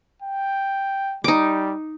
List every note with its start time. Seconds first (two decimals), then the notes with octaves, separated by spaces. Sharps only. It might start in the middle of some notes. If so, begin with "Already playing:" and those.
0.22 G5
1.24 G3 D#4 D6